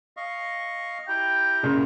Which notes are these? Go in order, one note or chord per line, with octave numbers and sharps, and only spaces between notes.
D#5 F5 C#6
E4 G4 G5 A#5
F#2 A#2 C#3